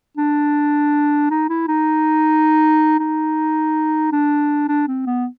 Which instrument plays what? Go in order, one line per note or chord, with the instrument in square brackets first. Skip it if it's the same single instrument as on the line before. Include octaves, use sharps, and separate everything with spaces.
[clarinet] D4
D#4
E4
D#4
D#4
D4
D4
C4
B3